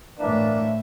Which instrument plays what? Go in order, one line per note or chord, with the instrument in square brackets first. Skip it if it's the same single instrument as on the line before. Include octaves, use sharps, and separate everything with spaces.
[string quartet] A2 E5 [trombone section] E3 A#3 D4